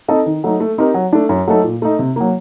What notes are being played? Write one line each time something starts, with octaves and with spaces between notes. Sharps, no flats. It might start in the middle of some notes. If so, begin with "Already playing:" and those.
C4 D#4 A4 D#5
D#3
F#3 A3 D#4
A3
C4 D#4 G4 A#4
F#3
A3 D4
F#2
F#3 A3 D#4 A4
A#2
A3 D#4
C3
F#3 A#3